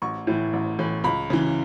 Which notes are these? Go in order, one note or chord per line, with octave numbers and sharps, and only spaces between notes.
A1 C#6
A2 E3
A1
A2 E3
C#2 B5
C#3 E3